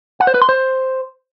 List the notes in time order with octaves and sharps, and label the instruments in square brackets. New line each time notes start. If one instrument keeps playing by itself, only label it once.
[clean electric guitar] F#5
C5
B4
C6
C5